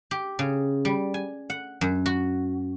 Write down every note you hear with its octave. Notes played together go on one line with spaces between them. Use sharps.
G4
C#3
G3
G#5
F#5
F#2
F#4